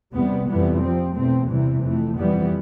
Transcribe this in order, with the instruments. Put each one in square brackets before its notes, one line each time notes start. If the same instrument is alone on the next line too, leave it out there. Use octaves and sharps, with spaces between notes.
[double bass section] E2 C3 G3 B3
F2 C3 E3 G3 B3
C3 F3 C4
E2 B2 A3 C4
E2 C3 E3 G3
F2 E3 A3
F2 E3 G3 B3